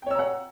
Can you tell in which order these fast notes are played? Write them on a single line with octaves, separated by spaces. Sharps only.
G5 C#5 E6 A#5 F#5